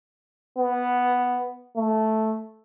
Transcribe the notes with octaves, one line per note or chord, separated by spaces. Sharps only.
B3
A3